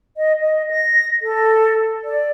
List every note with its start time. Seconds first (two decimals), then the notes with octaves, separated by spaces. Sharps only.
0.17 D#5
0.42 D#5
0.71 A#6
1.22 A4
2.04 D5